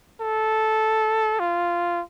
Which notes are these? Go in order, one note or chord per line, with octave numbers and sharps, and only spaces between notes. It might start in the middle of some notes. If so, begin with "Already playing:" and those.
A4
F4